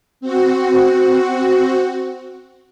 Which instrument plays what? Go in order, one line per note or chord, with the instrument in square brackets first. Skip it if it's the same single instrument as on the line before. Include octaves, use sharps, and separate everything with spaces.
[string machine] C4 F#4